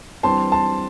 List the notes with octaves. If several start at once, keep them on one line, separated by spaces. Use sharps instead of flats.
G2 E3 G3 C4 A5 C6
A5 C6